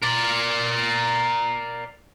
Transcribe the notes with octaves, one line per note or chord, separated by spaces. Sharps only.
A#4 D5